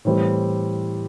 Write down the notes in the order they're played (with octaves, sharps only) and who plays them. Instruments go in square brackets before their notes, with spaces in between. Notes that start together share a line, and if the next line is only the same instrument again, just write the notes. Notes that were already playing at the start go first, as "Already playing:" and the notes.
[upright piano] A2 E3 G3 C4 G4